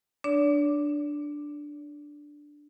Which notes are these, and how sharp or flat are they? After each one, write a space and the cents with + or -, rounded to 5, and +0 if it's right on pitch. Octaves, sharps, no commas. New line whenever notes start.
D4 +0 D5 -45